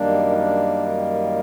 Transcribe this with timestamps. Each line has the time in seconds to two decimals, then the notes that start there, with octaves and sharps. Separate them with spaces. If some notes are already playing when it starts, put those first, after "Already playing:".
Already playing: F#2 D#3 G3 A#3 D4
0.31 D#4
0.37 D4